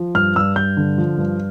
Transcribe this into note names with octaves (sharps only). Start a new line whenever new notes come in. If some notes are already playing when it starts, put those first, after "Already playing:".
Already playing: F3
G2 F6
G2 E6
G2 G6
D3
F3
G2